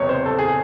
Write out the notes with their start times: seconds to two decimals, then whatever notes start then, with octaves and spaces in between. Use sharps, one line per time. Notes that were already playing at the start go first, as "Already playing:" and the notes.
Already playing: F#1 E2 C3 C#5
0.09 C5
0.26 A4
0.39 G#4